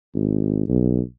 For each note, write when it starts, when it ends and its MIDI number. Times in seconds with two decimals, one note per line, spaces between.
0.14 0.63 32
0.68 1.01 35